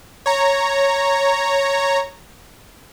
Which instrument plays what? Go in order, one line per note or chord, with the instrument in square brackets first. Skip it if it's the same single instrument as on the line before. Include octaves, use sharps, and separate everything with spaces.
[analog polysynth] C#5 A#5